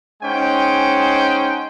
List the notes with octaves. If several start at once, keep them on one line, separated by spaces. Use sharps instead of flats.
G#3 C#4 D#4 C5 F#5 G5